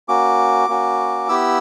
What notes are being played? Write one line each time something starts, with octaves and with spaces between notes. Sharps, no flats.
A#3 C#4 F#4 D6
A#3 C#4 F#4
B3 E4 G4 E6